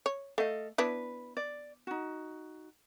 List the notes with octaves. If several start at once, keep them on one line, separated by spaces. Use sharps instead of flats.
C#5
A3 A4 D#5 F5
B3 D4 E4 B4
D5
D#4 F#4